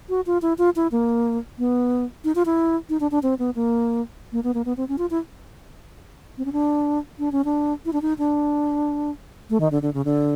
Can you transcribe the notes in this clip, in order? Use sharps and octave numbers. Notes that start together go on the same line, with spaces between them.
F#4
F4
E4
F4
E4
A#3
B3
D#4
F4
E4
D#4
D4
D4
C4
B3
A#3
A#3
B3
A#3
B3
C4
C#4
F4
E4
C4
C#4
D4
D4
C#4
D4
E4
D4
D#4
D4
A3
D#3
D3
D3
C#3
D3